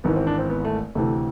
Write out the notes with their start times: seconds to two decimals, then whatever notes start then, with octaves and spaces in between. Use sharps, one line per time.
0.04 G#1 G#2 E3 B3
0.16 C4
0.27 D4
0.38 C4
0.50 B3
0.65 A3
0.95 D2 C3 E3 A3